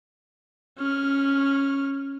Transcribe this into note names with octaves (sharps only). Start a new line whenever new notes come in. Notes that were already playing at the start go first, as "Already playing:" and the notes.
C#4 F6